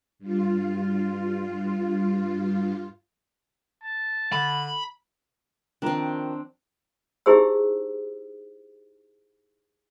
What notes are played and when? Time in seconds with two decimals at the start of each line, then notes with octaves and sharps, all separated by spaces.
0.19 G2 F4
3.83 A5
4.32 D3 B5
5.82 D#3 F3 C4 D4 A#5
7.26 D#4 E4 G4 G#4 C5 E6